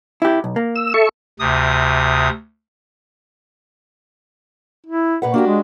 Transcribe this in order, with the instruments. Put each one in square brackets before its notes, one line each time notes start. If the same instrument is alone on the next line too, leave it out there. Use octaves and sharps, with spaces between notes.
[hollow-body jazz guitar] E4 G4
B1
A#3
[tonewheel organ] E6
A4 E5 C#6
[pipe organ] D2 C3 D#6
[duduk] E4
[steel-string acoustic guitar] A#2 B4 F#5
[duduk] A#3 [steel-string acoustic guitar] D4 F#4 G4
[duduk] G#3